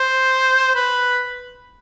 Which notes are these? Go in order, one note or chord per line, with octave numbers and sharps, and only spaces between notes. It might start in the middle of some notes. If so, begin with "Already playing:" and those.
Already playing: C5
B4